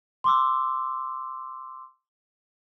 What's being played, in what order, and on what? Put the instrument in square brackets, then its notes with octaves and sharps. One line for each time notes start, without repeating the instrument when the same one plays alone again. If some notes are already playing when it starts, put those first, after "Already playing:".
[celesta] C6 D6 E6